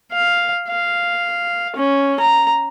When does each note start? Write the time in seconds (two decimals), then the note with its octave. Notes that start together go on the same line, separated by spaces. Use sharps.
0.12 F5
0.70 F5
1.76 C#4
2.20 A#5